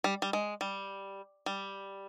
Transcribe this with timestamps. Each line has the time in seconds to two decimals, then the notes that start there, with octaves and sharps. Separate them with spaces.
0.04 G3
0.22 G3
0.33 G#3
0.61 G3
1.46 G3